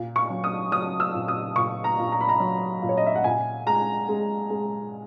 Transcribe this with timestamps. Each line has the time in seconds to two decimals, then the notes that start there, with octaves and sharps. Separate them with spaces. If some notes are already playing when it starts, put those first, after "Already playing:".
Already playing: A#2
0.16 C#6
0.30 F#3
0.44 D#6
0.72 F#3 D#6
1.00 E6
1.14 A#2
1.28 D#6
1.56 A#2 C#6
1.84 A#5
1.98 A#2
2.12 A#5
2.21 B5
2.29 A#5
2.40 F#3
2.82 A#2
2.89 C#5
2.97 D#5
3.06 E5
3.15 F#5
3.24 A#2 G#5
3.66 G#3 A#5
4.08 G#3
4.50 G#3